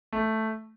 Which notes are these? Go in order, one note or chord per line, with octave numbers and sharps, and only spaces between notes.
A3